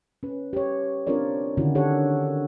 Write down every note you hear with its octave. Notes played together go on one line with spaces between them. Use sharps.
C#4 B4
G4 C#5
C4 D4 F4 A#4 C#5 D5
D3 D#3 C#4 E4 F#4
D4 G4 A4 C#5 F#5